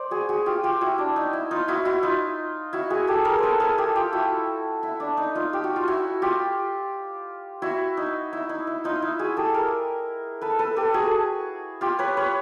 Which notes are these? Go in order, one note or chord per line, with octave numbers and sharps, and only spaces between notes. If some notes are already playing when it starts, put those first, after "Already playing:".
Already playing: C5 D5
F#4 G#4
F#4 G#4
F4 G4
F4 G4
E4 F#4
D4
D#4
E4
D#4 F4
E4 F#4
E4 F#4
D#4 F4
E4 F#4
F#4 G#4
G4 A4
G#4 A#4
A4 B4 C5
G#4 A#4
G4 A4
F4 G4
E4 F#4
E4
D4
D#4
D#4 F4
G4
F#4
F4
E4 F#4
F4 G4
E4 F#4
D#4
E4
D#4
E4
D#4 F4
F4
E4
F#4 G#4
G4 A4
G#4 A#4
A4 B4
A4 B4
G4 A4
F#4 G#4
F4 G4
B4 C#5
B4 C#5